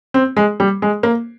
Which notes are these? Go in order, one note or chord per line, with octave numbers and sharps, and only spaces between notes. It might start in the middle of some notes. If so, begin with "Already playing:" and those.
C4
G#3
G3
G#3
A#3